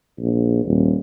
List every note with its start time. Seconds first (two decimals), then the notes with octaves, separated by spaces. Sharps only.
0.19 A#1
0.65 D#1